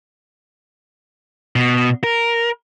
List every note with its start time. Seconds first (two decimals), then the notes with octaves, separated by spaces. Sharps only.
1.56 B2
2.04 A#4